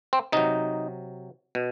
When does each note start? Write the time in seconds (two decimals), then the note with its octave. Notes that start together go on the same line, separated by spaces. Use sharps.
0.13 C4
0.32 C3 F#3 D#4
1.55 B2